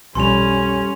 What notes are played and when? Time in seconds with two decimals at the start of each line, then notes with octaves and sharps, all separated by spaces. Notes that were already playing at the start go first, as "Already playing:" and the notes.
0.15 B1 F2 F3 G3 C#4 G#5 C6 F7